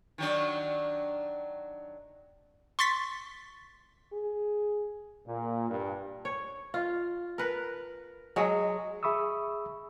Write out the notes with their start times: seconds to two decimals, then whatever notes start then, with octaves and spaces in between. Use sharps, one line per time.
0.18 D#3 F#3 D4
2.79 C6 C#6 A6 B6
4.13 G#4
5.28 A#2
5.70 G2
6.25 C#5
6.74 F4
7.38 A#4 B4
8.36 F#3 G#3
9.03 G#4 E5 B5 C#6 D#6 E6